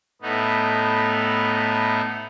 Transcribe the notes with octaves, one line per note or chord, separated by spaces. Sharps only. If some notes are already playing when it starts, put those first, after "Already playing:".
A2 A3 B3 D#4